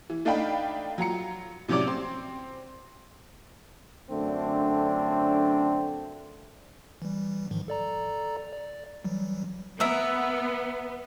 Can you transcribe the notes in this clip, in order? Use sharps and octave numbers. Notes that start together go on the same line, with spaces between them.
E3
A3 D4 D#4 F5 G5 B5
F#3 F4 A#5 C#7
A2 C3 F#3 C#4 D5 D6
C4 C6
F#2 D3 A3 C4 D4
E3 G3
G#2 D#3 F3
A4 D5 A#5
D5
E3 F#3 G3
B3 A#4 E5